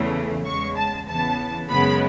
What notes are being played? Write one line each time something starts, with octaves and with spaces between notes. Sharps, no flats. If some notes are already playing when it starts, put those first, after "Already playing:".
Already playing: E2 C#3 E3 A3
E2 C#3 G#3 C#6
A5
E2 C#3 E3 B3 A5
F#2 C#3 G#3 B3 B5